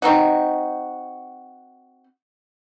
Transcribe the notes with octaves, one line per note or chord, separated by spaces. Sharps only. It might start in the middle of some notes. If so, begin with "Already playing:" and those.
C4 D#4 F#4